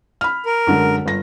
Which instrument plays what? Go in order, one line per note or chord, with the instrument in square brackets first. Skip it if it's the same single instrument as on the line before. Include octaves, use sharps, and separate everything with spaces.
[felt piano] B5 F6
[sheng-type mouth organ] A#4
[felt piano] F#2 D3 G#3
G1 A#6